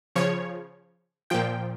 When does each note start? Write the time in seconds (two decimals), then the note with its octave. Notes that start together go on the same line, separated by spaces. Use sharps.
0.15 C#3 F3 C#5
1.30 A#2 F3 G5